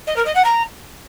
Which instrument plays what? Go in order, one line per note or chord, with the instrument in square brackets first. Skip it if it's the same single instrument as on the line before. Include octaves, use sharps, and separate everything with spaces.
[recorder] D#5
A#4
D#5
F#5
A#5